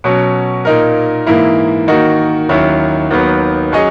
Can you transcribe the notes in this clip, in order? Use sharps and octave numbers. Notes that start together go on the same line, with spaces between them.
B2 F#3 C#4
A#2 A#3 D#4 A#4
G#2 E3 A#3 E4
D#3 A#3 D#4 F#4
D#2 D#3 F#3 C#4 E4
D#2 D#3 F#3 B3
F#3 C#4 G#4 D#5